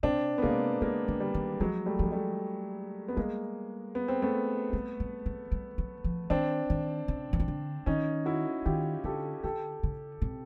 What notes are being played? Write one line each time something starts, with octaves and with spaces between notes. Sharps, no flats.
C3 C4 D4
B3
C3 G#3 A#3
C#3 G#3 A#3
D3
G3
D#3
F3 F#3 G#3
G3 A3
F3 G#3
G3 A3
B3
G3 G#3 A#3
B3
C4
A3 B3
G3
G3
F#3
G3
F#3
F3
D#3 C4 D4
D#3
C#3
E3
D#3
D3
D#3 C#4 D#4
E4 F#4
D#3 F4 G4
D3 G4 A4
D3 G4 A4
C#3
C3